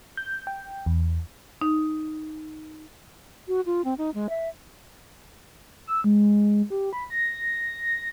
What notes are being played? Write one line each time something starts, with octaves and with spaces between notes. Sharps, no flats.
G6
G5
E2
D#4
F#4
F4
C4
D#4
G#3
E5
E6
G#3
G4
B5
A#6